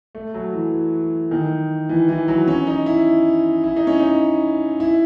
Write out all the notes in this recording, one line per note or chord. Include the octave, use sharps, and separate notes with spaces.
A3
F#3
E3
D#3
E3
E3
F#3
C#4
D#4
E4
E4
D#4
C#4
D#4
E4